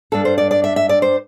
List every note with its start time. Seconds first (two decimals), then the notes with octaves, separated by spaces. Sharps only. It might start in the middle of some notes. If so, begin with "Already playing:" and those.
0.12 G2 G3 D4 A4
0.25 C5
0.38 D5
0.51 D5
0.64 E5
0.76 E5
0.89 D5
1.02 C5